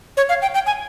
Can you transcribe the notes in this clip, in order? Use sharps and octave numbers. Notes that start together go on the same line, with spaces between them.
C#5
F5
G5
G5
G#5